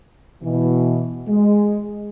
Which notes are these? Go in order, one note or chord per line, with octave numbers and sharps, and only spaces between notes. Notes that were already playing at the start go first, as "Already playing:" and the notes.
B2 E3
G#3